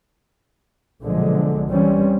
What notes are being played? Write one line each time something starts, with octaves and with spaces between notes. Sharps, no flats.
B1 A#2 D3 F3 G#3
E3 G3 C4 C#4